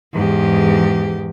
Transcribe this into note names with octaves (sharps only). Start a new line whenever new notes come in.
E2 G#2 G4